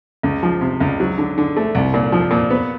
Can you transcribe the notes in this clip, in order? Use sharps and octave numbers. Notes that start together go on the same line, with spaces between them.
C#2
F3
C3
C#2
F#3
D3
D3
A3
C2
A#2
F3
A#2
B3